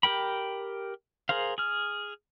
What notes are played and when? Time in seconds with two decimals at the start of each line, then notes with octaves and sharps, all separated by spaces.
0.03 G4 A#4 G5 B5
1.29 G#4 A#4 C5 F5
1.58 G#4 F6